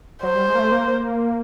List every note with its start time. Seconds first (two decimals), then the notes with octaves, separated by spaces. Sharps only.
0.23 F#3 C5
0.35 G3
0.48 G#3
0.55 A#3
0.59 A3
0.71 A#3